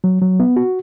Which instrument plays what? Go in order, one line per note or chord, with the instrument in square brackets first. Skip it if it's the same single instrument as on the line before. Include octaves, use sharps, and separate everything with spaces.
[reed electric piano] F#3
F#3
B3
F#4